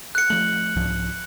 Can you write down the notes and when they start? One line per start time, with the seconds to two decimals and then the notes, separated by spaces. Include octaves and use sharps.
0.15 F#6 C#7
0.30 F3 A3 F#7
0.76 C2 G#2 F3